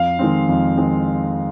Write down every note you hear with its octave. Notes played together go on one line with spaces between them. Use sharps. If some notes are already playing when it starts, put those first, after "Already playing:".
Already playing: F2 F5
D#3 G#3 C4
F2
D#3 G#3 C4